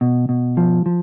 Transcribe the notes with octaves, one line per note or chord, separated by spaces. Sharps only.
B2
B2
F3
F3